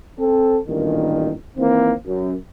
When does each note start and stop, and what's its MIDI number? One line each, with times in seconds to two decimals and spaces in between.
0.19 0.58 60
0.19 0.58 69
0.68 1.31 33
0.68 1.31 43
0.68 1.31 46
0.68 1.31 51
1.57 1.91 51
1.57 1.91 52
1.57 1.91 58
1.57 1.91 60
2.05 2.34 42